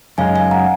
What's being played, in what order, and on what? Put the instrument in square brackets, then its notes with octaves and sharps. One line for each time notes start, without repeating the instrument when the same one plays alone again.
[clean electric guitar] F#2 C#3 G#3 D#4 [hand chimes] F5 G#5
[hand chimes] F5 G#5
F#5 A#5